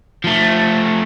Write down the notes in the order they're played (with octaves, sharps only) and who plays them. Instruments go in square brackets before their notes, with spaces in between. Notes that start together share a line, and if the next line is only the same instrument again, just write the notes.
[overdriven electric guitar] F3 A3